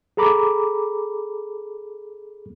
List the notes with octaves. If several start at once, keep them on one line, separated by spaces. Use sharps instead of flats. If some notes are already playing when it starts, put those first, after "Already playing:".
G#4 A4 A#5 B5 D6